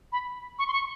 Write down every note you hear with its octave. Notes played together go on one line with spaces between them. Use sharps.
B5
C#6
C6
C#6